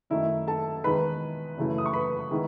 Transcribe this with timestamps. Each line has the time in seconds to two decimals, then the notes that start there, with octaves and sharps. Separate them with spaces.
0.10 F#2 D#3 A3 D#4 E4 E5
0.47 A4 A5
0.84 E2 D#3 G#3 D#4 B4 B5
1.58 F#2 C#3 E3 A3 E4
1.78 D#6
1.86 C#6
1.93 B4 B5
2.31 D#3 G#3 B3 E4